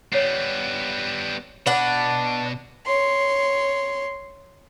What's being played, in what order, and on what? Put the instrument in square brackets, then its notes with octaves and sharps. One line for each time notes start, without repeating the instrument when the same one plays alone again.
[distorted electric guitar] G3 B3 [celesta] C#5 C7
[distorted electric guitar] B2 B5 [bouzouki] D4 F#5
[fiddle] C#5 C6